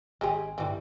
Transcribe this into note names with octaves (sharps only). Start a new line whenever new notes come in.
G#1 G#3 G4 G#4
G2 A#2 D3 E3 G3